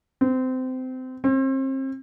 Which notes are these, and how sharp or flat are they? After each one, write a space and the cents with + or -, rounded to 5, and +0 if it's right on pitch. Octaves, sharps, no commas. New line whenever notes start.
C4 -25
C4 +35